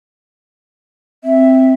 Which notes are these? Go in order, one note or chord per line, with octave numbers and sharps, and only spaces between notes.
C4 E5